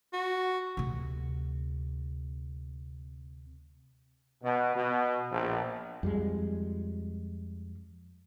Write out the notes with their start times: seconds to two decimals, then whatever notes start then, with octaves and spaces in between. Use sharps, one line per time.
0.13 F#4
0.77 D2 C3
4.43 B2
4.75 B2
5.31 A#1
6.03 F2 G3 G#3